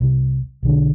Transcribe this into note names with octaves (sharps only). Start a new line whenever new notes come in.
C2
B1 D3 D4